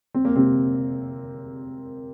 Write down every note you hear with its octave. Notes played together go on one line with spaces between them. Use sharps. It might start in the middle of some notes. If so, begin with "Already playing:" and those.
C4
A#3
C3 C4